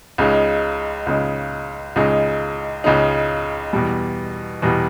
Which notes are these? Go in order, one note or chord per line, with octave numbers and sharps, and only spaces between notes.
C#2 C#3 G#3 D#4
C#2 C#3 G#3 D#4
C#2 C#3 G#3 D#4
C#2 C#3 G#3 D#4
E2 B2 G3
E2 B2 G3